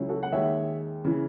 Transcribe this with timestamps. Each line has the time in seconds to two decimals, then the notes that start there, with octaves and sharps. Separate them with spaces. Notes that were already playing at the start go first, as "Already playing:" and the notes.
Already playing: C#2 C#3 F#3 C#4 E4
0.09 F#4 A4
0.23 F#5
0.32 D#2 D#3 G#3 C#5 E5
1.04 C#3 E3